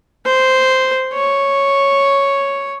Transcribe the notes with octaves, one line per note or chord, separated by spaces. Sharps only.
C5
C#5